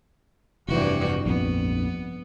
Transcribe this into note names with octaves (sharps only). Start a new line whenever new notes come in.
F1 G2 C3 E3 F#4
A#1 F2 B3